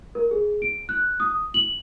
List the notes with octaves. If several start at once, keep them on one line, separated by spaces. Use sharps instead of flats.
A#4
G#4
D7
F#6
D#6
F#7